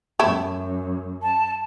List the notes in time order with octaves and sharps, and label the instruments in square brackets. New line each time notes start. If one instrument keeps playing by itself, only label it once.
[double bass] F#2 [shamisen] A3 E4
[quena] A5